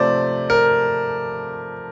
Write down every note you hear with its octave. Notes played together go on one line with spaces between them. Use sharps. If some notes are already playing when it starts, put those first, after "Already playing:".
Already playing: C3 F3 A3 C5 D5
A#4